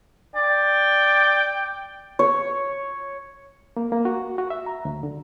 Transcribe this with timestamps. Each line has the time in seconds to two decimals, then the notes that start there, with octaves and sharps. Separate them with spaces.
0.36 D5 G5
2.19 C#5
3.77 A#3
3.92 A#3
4.05 F#4
4.38 F#4
4.50 E5
4.66 A#5
4.85 D2
5.03 D3